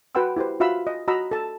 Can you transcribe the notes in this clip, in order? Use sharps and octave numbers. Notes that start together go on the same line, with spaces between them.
F#4 B4 F#5 G5 C6 E6
E4 G4 B4 C5
F4 F#4 E5 F5 B5 E6
D#5
F#4 D#5 A#5 B5 E6
A4 A5